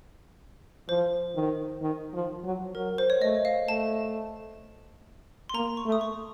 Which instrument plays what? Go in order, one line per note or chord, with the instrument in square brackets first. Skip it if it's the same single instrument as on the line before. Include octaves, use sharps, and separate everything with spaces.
[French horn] F3 [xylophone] C5
[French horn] D#3
D#3
F3
F#3
[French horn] F#3 [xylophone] A#4
[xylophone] C5
C#5
[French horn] A3 [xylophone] D#5
[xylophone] F5
[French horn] A3 [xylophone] A5
[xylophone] C6
[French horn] A#3 [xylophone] A#5
[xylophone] C#6
[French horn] A3
[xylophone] D#6
C#6